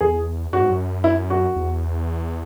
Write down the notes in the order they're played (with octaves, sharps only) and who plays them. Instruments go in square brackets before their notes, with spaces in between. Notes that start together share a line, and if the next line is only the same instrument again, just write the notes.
[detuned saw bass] E2 [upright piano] G#4
[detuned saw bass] F#2 [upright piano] F#4
[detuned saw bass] G#2
F#2
[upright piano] E4
F#4
[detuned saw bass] E2